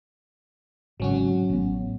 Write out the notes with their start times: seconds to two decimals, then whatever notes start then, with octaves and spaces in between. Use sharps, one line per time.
1.00 G#1 C#3 F#3 C#4 F#4
1.49 A1 B3